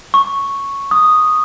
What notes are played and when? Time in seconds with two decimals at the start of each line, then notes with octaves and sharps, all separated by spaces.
0.14 C#6
0.91 D#6